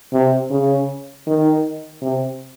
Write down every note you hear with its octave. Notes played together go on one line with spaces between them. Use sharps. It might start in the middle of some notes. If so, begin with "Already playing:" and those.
C3
C#3
D#3
C3